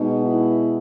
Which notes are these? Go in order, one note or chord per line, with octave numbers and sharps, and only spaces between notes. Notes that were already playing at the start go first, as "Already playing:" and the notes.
Already playing: B2 G#3 B3 D#4
E4